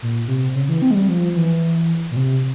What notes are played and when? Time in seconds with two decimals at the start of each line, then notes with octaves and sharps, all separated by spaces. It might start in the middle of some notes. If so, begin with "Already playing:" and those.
0.02 A#2
0.28 C3
0.55 C#3
0.69 E3
0.82 C4
0.91 G#3
0.95 G3
1.08 F3
1.36 E3
2.11 A#2
2.16 C3